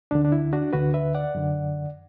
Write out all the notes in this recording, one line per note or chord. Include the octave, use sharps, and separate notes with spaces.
D2 D3 D4
D4
E4
D4 F#4
D2 D3 F#4 B4
B4 E5
D5 F#5
F#2 D3